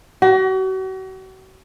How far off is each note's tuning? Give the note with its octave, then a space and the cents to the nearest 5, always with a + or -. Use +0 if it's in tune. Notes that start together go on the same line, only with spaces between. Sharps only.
F#4 +40